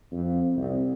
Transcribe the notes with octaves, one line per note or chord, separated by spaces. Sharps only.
F2
C2